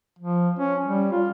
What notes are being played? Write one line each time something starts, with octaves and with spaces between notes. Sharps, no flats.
F3
C#4
G3
F4